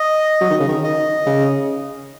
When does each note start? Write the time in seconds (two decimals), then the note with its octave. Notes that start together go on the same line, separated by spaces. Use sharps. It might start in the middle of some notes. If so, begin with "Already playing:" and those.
Already playing: D#5
0.41 F#3
0.50 D#3
0.60 C#3
0.68 D#3
0.84 D#5
1.26 C#3